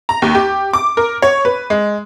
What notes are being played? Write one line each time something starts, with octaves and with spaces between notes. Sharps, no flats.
A#5
D#2
G4
D6
A#4
C#5
B4
G#3